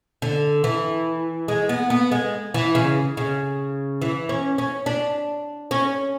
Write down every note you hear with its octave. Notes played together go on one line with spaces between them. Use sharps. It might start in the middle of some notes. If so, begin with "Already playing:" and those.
D3
E3
G#3
B3
B3
G#3
E3
C#3
C#3
E3
C#4
C#4
D4
C#4